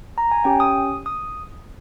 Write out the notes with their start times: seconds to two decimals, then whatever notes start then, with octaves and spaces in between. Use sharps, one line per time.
0.18 A#5
0.31 G#5
0.44 C#4 G4 G5
0.60 D#6
1.06 D#6